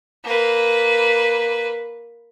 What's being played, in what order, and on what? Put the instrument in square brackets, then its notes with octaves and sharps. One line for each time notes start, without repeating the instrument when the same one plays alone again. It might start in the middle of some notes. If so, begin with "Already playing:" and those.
[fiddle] A#3 B4